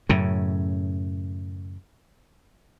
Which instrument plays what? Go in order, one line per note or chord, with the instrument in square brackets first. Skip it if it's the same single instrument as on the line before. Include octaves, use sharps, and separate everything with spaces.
[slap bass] F#2 A2 C#3